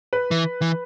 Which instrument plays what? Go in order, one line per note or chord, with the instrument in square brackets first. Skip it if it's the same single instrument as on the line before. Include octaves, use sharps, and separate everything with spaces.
[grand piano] B4
[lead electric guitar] E3
E3